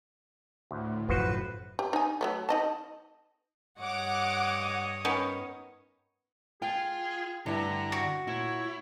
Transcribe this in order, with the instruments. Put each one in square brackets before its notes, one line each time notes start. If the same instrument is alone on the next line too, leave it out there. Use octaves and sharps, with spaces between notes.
[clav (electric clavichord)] D2 [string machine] A2
[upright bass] F#2 C#3 [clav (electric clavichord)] F3 F#4 C5 [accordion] B4
[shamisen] G4
D#4 G#5
F#3 G#3 A3
D#4 D#5 A5
[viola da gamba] G2 C#5 D#5 [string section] F#5 D6
[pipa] D#3 B3 C#4
[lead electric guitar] F4 [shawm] G#4 [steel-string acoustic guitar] G5
[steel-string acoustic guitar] G2 E4 [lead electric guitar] D3 [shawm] A#5
[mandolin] F#4
[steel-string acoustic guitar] A#2 [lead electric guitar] E4 [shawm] C#5